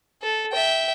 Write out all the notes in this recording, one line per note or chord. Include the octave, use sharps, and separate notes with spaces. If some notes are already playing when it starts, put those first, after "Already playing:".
A4
E5 G5